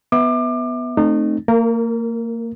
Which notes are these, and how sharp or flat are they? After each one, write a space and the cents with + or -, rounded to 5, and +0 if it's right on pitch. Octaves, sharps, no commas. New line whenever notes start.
B3 +0 E5 -20 D6 +30
A3 +0 C4 +0 D#4 -30
A#3 -30 A#4 +0